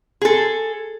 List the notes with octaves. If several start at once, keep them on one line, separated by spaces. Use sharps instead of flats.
G#4 A4